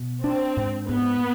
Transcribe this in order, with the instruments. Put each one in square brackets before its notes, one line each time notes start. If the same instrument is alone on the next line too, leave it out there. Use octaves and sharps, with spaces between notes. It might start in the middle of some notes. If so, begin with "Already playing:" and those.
Already playing: [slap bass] B2
[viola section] C4 [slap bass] D4
[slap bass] G#2
[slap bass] G#2 [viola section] B3